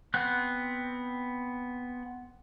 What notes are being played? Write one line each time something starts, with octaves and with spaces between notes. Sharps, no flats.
B3 C4 F#6